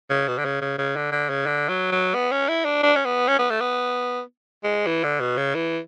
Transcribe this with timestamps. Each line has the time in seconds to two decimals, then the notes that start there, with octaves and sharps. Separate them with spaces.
0.10 C#3
0.28 B2
0.38 D3
0.45 C#3
0.61 C#3
0.78 C#3
0.96 D3
1.12 D3
1.30 C#3
1.46 D3
1.69 F#3
1.92 F#3
2.15 B3
2.32 C#4
2.49 E4
2.65 D4
2.83 D4
2.96 C#4
3.05 B3
3.28 C#4
3.38 B3
3.50 A3
3.61 B3
4.64 G#3
4.86 E3
5.04 D3
5.20 B2
5.37 C#3
5.55 E3